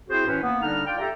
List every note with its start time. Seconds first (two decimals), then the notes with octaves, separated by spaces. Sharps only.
0.09 C4 E4 F#4 G#4 C5
0.26 A2 E3 C#4 B4
0.42 A#3 B3
0.62 D3 G3 D4 D#4 F6
0.86 F4 D5 G5
0.99 G4 A4 E5 A#5